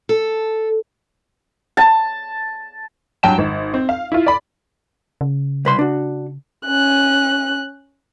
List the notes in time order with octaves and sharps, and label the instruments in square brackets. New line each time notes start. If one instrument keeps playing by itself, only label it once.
[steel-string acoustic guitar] A4
[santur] A5
[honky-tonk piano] G2 F#3 G5 A5 E7
G#1
C4
F5
E4 F4
D5 B5
[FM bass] C#3
[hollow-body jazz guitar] C2 B4 C6
D4 F#4
[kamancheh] C#4 F#6